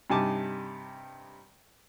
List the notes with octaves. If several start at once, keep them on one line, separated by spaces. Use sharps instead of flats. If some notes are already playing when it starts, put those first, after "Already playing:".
G2 C3 D#4 G#5 A5 D6